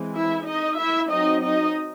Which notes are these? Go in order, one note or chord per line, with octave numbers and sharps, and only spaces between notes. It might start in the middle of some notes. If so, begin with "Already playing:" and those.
Already playing: E3 G#3 C4
E4 E5
D#4 D#5
E4 E5
F#3 C4 D#4 D#5
D#4 D#5